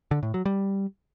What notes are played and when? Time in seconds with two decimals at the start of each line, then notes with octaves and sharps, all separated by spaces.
0.11 D3
0.23 A2
0.34 F#3
0.46 G3